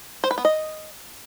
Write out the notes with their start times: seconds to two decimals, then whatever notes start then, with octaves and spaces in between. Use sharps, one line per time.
0.24 C5
0.31 B4
0.38 B3
0.45 D#5